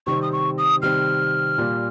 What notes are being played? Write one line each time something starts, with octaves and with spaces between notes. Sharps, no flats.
C3 D#3 G3 C4 C#6
D#6
C#6
D#6
C3 D#3 G3 C4 F6
A#2 G3 A#3 F4